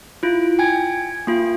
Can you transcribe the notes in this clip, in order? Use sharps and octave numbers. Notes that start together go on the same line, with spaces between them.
E4 F4
G5 G#5 G#6
A#3 F4